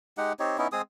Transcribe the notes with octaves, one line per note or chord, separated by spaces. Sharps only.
G#3 D#4 G4 F#5
C4 D#4 G4 C#5
B3 C#4 D#4 E4
G#3 C4 G#4 D#6